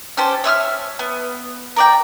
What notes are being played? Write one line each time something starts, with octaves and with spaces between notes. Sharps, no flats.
C#4 G4 A4 C5
C#5 E5 D#6 F6
B3
A#4 D5 G5